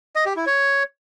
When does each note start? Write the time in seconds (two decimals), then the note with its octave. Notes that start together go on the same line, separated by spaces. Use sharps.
0.15 D#5
0.26 G4
0.36 E4
0.46 C#5